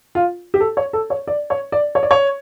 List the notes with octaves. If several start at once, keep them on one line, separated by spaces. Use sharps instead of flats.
F4
G4
A4
C#5
A4
C#5
D5
C#5
D5
C#5
D5
C#5